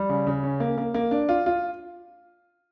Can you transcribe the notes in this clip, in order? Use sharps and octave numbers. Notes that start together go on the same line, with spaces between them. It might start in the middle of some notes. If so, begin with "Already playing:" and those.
Already playing: G3
C#3
C#3
C#4
A#3
A#3
A#3
D4
F4
F4